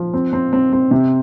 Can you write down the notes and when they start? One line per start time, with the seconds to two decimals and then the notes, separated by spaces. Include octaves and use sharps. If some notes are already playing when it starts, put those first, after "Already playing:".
Already playing: F3
0.13 C4
0.33 C4
0.53 C4
0.73 C4
0.91 C3